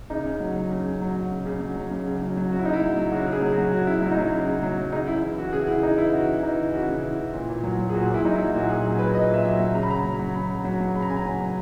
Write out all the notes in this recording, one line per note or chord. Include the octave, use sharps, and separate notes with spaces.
C#3 D#4
C#3
F#3
F#3
C#3
C#3
F#3
F#3
C#3
C#3
F#3
F#3
C#3
C#3
F#3
F#3
C#3 F#4
E4
C#3 D#4
E4
F#3
F#3
C#3 F#4
C#3
G#4
F#3
F#4
F#3
C#3 F#4
C#3 E4
F#3 E4
D#4
F#3 E4
C#3
C#3
F#3
F#3
C#3 D#4
C#3 E4
E3 E4
E3 F#4
C#3 G#4
F#4
C#3 E4
E3 D#4
E3 E4
C#3 F#4
C#3
E3 D#4
E3
C#3 F#4
C#3
E3
E3
A#2
A#2
F#3
F#3
G#4
A#2 F#4
A#2
E4
F#3 D#4
E4
F#3
A#2 F#4
A#2 G#4
F#3
F#3 B4
A#2 D#5
A#2 E5
F#3
E5
F#3
C#3 A#5
B5
C#3 A#5
F#3
F#3
C#3 B5
C#3
F#3
F#3
C#3 B5
A#5
C#3 G#5
A#5
F#3
F#3